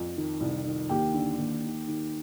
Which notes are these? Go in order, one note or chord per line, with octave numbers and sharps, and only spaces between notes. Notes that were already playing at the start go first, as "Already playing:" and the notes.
Already playing: F2
D#3
C2
D#3
D#2 G4 G5
D3
D#2
D#3
D#3